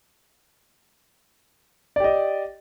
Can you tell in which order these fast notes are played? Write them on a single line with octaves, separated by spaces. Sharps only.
D5 G4 D#5